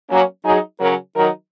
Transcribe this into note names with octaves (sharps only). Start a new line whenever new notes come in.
F#3 A#3 C#4
F#3 D#4 G#4
C#3 F#3 C#4 A#4
D#3 F#3 D#4 A#4